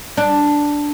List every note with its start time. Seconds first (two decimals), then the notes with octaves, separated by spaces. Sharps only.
0.17 D4